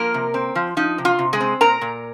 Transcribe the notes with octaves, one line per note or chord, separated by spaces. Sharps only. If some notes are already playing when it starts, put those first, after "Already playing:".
Already playing: F3 A#3 A#4
C3
C4
F3
F3 D#4
C3
F4
C3
G#3 G#4
C4
A#2 A#4 A#5
A#2